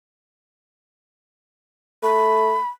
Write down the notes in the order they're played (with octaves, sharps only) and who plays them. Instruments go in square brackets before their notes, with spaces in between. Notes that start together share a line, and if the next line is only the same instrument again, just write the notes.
[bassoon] A3 [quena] B5